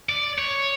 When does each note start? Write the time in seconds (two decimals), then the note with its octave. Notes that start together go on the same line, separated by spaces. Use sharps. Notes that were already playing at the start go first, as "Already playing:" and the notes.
0.09 D5
0.38 C#5